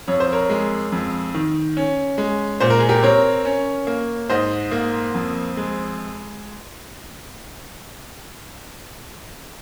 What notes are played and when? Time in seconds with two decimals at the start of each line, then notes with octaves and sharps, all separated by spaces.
0.07 F2 C#5
0.20 C5
0.32 A#4 C#5
0.50 G#3
0.92 F2
1.34 D#3
1.77 C#4
2.18 G#3
2.60 A#2 C5
2.70 A#4
2.79 G#4
2.89 G4 A#4
3.03 C4 A#4 C#5
3.45 C#4
3.87 A#3
4.30 G#2 C5 D#5
4.71 A#3
5.14 F2
5.57 G#3